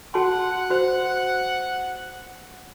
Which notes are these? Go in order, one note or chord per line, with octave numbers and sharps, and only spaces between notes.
F#4 F#5 A5 C6
F#4 C5